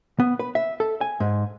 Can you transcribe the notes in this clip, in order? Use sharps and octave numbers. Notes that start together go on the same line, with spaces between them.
B3
B4
E5
A4
G#5
G#2